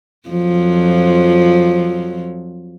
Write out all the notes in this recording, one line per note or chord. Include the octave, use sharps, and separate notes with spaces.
F2 F3 F#3